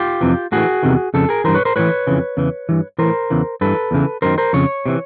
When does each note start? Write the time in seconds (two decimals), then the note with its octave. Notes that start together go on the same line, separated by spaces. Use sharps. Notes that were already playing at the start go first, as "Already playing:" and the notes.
Already playing: F4 G4
0.21 F2 C3 E3
0.52 A2 E3 F#4 G#4
0.83 E2 C3 D#3
1.14 F2 C#3 A4
1.29 G#4 A#4
1.44 G2 E3 A#4 C5
1.54 B4 C#5
1.65 A#4 C5
1.76 A2 E3 B4 C#5
2.07 F2 C#3 E3
2.37 E2 C#3 E3
2.69 G2 E3
2.99 A2 E3 A#4 C5
3.30 E2 C#3 E3
3.61 G2 E3 A4 B4
3.91 E2 C#3 E3
4.22 F#2 D#3 A#4 C5
4.38 A#4 C5
4.53 F2 C#3 C#5
4.86 C3 E3